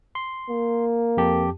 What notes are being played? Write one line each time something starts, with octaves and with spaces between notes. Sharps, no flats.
C6
A#3
F2 G4 A5